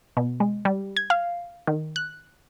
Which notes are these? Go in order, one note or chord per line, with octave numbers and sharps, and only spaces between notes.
B2
G#3
G3
G#6
F5
D#3
F#6